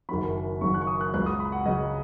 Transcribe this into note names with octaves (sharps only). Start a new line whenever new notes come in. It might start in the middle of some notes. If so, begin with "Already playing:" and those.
F#1 F#2 D#3 F#3 B5
F#1 F#2 D#3 F#3 C#6
F#6
C#6
D#6
F#6
C#2 C#3 F#3 F#6
D#6
B5
F#5
C#2 C#3 F#3 D#5